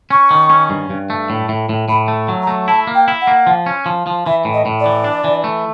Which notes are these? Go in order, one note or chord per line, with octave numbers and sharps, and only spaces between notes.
C#4 C#6
D#3
C#4
G2
G2
A3
A2
A2
A2
A2 B5
A3
F#3
A#5
A3
E4 A5
A#3
G5
E4
F#5
A#3
F3
C#4
F3
F3
E3 E5
A2
D#5
A2
D5
E3
D4
E3
A3